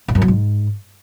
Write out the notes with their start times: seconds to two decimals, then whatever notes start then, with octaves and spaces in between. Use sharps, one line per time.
0.08 G2
0.15 F#2
0.22 F#3
0.28 G#2